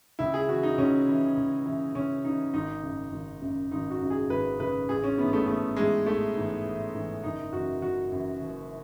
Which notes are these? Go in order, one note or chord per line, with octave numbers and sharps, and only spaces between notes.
C#2 E4
G#4
C#3 E3 F#4
D#4
C#2 C#4
C#3 E3
C#2
C#3 E3
C#2 C#4
C#3 E3 D#4
G#1 D#4
F#2 C#3
G#1
F#2 C#3
G#1 D#4
F#4
F#2 C#3
G#4
G#1 B4
F#2 C#3 B4
A1 G#4
C#4
G#2 E3 B3
A3
A1 A3
G#2 E3 G#3
A1 A3
G#2 E3
A1
G#2 E3
F#1 D#4
F#2 E3 F#4
F#1 F#4
F#2 E3
F#1